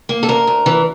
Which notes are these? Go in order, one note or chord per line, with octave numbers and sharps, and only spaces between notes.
A#3
A4
D2 A#4
D2
E3